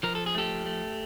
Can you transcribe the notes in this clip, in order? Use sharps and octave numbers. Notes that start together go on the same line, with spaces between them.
F3 A#4
A4
G#4
A3 G4 A4
A3